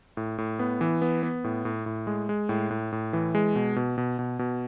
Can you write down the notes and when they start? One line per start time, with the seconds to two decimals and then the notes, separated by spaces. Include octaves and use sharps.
0.17 A2
0.38 A2
0.59 B3
0.81 E3
1.02 B3
1.23 B3
1.44 A2
1.65 A2
1.86 A2
2.07 G#3
2.29 G#3
2.49 A2
2.71 A2
2.92 A2
3.13 E3
3.35 G#3
3.55 B2
3.76 B2
3.98 B2
4.19 B2
4.39 B2